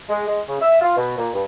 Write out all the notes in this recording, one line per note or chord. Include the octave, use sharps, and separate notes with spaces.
G#3
G#3
C#3
E5
F4
B2
A#2
G2